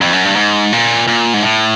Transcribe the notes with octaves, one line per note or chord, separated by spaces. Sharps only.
F2
F#2
G2
G#2
A#2
A#2
G#2
A2